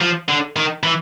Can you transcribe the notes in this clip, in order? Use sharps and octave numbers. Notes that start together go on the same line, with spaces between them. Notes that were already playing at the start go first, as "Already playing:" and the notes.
F3
D3
D#3
E3